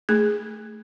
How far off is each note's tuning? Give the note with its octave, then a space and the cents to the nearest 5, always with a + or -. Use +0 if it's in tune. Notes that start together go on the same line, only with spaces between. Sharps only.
A3 +0 G#4 +0